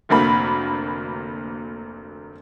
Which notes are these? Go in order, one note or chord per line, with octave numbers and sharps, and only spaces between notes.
F1 D2 A#3 B5